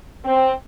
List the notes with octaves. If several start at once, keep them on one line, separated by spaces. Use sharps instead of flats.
C4